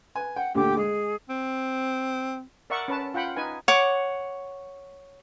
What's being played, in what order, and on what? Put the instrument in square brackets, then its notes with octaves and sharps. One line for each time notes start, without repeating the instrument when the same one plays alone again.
[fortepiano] B4 G#5
[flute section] F#5 [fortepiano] G5
[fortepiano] D2 A#2 D3 [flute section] G4 D6
[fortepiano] G#3 [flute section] G#4
[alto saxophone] C4
[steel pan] A#4 D5 E5 F#5 C#6
C#4 B4 A5
F4 F#5 G5 B5
D#4 B4 G#5
[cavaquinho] C#5 F#5 D6